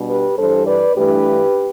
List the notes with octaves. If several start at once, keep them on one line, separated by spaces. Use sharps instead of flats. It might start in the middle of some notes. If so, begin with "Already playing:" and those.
Already playing: B2 G3 D4
G4 B4
G2 E3 G3 D4 A4 C5
B4 D5
G2 E3 A3 D4 G4 B4